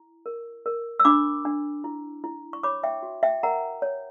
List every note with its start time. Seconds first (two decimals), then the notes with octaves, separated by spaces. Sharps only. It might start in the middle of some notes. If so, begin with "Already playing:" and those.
Already playing: E4
0.26 A#4
0.66 A#4
1.00 E6
1.05 D4 B5 D6
1.45 D4
1.84 E4
2.24 E4
2.53 C#6
2.63 C#5 B5 D6
2.83 E5 G5
3.03 F#4
3.23 E5 G5
3.43 A#4 F#5 A#5
3.82 C#5